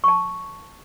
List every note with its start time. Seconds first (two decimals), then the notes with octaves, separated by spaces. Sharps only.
0.04 A5 C#6